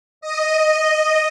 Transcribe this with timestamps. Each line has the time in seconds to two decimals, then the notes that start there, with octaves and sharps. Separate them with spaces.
0.21 D#5